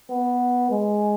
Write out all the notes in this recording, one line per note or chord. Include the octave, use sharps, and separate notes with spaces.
B3
G#3